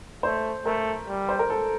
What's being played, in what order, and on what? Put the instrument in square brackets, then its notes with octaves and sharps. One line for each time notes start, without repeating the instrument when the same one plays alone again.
[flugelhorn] A3 [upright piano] C5
[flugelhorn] A3 [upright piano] A#4
[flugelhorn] G3
[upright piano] C5
A#4
A4